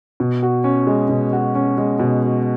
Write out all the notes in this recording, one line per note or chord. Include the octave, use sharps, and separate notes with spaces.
B2
F#4
C#4
G#3
B2
F#4
C#4
G#3
B2
F#4